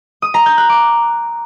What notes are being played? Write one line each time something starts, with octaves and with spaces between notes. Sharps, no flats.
D#6
A#5
G6
F#6
D6